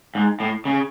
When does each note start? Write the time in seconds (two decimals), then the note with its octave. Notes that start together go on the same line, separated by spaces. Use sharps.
0.15 G#2
0.40 A2
0.65 C#3